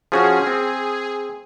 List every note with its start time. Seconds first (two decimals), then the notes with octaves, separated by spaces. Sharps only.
0.12 F3 C#4 F#4 G#4
0.47 C4